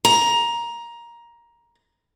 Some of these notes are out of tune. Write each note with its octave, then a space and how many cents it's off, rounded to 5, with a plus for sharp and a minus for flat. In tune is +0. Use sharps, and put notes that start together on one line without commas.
A#5 +15